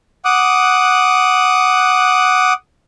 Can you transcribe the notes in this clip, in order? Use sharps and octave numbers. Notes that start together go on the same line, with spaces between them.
F#5 D6 D#6 F#6